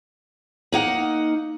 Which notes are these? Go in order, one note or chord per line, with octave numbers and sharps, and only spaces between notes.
A#3 D#4 F#5